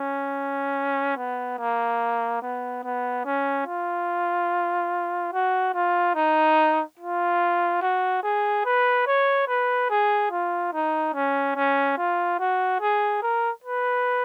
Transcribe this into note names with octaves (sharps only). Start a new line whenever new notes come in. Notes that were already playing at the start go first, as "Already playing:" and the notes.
Already playing: C#4
B3
A#3
B3
B3
C#4
F4
F#4
F4
D#4
F4
F#4
G#4
B4
C#5
B4
G#4
F4
D#4
C#4
C#4
F4
F#4
G#4
A#4
B4